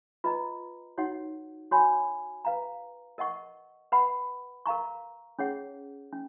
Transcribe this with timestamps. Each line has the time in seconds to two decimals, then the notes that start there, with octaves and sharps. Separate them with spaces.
0.24 F4 B4 D#5 A#5
0.98 D#4 F#4 C#5 F#5
1.71 F#4 C#5 G#5 B5
2.45 B4 F5 A#5
3.18 A#4 D#5 F#5 C#6
3.92 B4 F#5 B5
4.66 A#4 F5 A#5 C#6
5.39 C#4 G#4 C#5 F#5
6.12 C#4